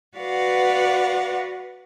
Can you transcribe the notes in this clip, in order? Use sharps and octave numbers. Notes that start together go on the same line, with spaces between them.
F#4 B4 D5 F5 F#5